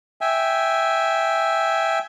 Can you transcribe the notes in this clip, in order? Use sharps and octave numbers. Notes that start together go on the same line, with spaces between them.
E5 G5 G#5